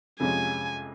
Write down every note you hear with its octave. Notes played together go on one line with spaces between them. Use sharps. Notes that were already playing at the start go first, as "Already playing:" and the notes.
F2 C3 F3 G#3 C#4 G#5